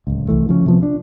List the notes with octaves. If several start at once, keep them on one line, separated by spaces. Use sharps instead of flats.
D1 C#2
C2 E3 A3
C#3 F3 F#3 C#4
C3 F3 B3
D4